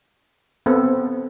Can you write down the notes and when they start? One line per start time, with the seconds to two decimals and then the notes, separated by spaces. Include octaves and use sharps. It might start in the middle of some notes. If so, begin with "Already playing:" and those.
0.66 B3 C4 A4